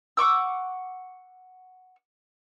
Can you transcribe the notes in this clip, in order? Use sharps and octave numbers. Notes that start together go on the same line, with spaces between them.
F#5 C#6 D6 E6